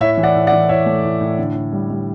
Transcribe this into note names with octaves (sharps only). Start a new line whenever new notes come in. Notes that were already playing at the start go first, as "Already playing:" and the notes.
A2 C#5 E5
E3
D5 F#5
A2
D5 F#5
E3
A2 C#5 E5
A3
A2
A2
D3
D3
G3
G3